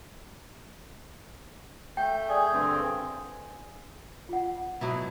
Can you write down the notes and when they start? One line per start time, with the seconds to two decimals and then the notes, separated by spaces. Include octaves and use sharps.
1.97 A3 G5 G6
2.30 G#4 D5
2.53 G2 D3 C4
4.29 F4 F#5
4.81 B2 F#3 E4